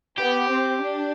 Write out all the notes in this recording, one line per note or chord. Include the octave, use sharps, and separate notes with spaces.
B3 G4
C4
D4